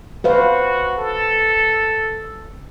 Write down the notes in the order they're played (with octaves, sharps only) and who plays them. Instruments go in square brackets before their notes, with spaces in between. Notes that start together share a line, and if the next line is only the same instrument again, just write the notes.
[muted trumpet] F#4 [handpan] B4 C5 F5
[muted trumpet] A4